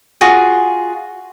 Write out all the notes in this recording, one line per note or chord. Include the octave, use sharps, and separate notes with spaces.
F4 F#4 G#4